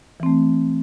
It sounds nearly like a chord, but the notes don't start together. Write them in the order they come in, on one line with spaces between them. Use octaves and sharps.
E3 C4 A3